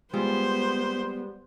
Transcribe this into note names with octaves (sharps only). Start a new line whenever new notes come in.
G3 G#3 B3 F4 C5